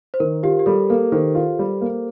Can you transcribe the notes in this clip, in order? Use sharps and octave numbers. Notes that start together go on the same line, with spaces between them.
C5
D#3 A#4
F4 G4
G4
G3 A4
A#3 A4
D#3 C5
F4
G3
A#3